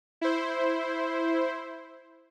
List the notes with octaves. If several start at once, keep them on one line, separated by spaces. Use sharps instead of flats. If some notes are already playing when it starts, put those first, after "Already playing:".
E4 C5